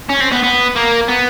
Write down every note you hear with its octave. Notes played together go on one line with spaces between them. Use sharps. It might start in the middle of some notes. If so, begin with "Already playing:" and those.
C#4
C4
B3
B3
A#3
B3